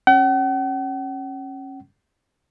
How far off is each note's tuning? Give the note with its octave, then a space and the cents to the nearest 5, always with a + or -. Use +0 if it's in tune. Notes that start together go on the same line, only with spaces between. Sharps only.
C#4 -25 F#5 +45